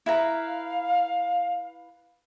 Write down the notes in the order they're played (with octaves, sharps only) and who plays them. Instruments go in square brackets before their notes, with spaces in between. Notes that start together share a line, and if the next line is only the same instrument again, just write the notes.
[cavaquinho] E4 B4 A#5 [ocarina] F5